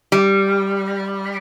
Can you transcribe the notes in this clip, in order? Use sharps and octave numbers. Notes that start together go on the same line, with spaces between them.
G3